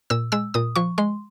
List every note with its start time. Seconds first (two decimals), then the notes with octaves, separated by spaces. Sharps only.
0.10 A#2 E6
0.32 G#3 E6
0.54 A#2 D#6
0.76 F3 C#6
0.98 G#3 C6